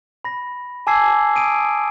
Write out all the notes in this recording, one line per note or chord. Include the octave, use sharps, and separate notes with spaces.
B5 A#6
G#5 A5 D6 E6 G#6 C7
D#6 D7 D#7